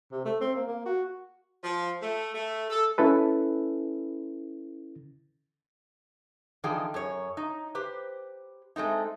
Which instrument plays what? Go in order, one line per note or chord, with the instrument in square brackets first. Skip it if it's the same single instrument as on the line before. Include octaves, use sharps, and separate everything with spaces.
[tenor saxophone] C3
A3
C4
A#3
A#3
F#4
[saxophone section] F3
A3
A3
A4
[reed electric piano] C#4 E4 A4 B4
[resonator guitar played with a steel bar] D3 E3 F3 D#4 G#4 G5
F#2 G#4 C#5
D#4
G4 B4 C5
G#3 A3 C4 D#4